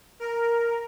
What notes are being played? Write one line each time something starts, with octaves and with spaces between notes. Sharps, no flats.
A#4